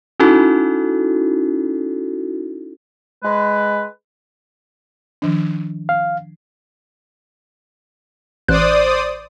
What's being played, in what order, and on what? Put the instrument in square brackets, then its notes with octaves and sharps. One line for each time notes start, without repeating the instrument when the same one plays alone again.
[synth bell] C#4 D#4 E4 F#4 A4
[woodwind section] G#3 B4
[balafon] D#3 F3 D4
[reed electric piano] F5
[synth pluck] A1 F#6 [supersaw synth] C5 D5 D#6